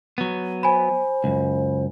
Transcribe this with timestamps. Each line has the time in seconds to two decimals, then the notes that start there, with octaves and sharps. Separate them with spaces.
0.18 F#3 B3
0.63 C5 G#5 B5
1.24 C#2 F#2